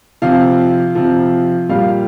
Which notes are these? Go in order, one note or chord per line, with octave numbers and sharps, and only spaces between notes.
C3 F3 F5
C3 F3
A#2 G3 F5